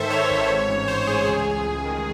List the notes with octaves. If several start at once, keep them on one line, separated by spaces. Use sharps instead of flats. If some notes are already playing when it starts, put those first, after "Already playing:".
Already playing: G#2 D#3 A4 C5 E5
D#3 C#5
G#1
G#2
A1
G#2 C5
A1 G#4
C#2 G#4
C#2
C#2
D#3